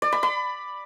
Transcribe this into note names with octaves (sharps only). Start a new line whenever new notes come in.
D5
B5
B5